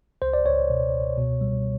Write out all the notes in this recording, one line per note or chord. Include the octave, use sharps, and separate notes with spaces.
C#2 C5
D5
C#2 C#5
B2
C#2
B2
G3